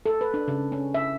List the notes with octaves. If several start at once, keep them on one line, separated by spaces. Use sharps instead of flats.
A4
B4
D4
C#3
C#4
E5